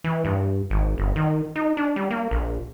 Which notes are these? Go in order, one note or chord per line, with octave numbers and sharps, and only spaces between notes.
E3
G2
G#1
G1
D#3
D#4
D4
G3
A#3
A#1